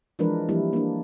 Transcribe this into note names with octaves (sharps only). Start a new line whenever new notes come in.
E3 F3 G#3 D4 A#4 B4
E3 F3 G3 A#3 E4
A#3 D4